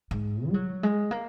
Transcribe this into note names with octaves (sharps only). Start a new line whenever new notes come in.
G#2
G#3
F#3
G#3
A#3